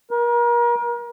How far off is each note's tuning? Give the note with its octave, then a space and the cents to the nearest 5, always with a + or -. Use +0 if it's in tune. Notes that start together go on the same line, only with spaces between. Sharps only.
A#4 +35